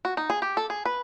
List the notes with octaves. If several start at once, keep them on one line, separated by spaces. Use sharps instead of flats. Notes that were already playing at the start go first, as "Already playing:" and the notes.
F#4
D#4
G#4
G4
A4
G#4
B4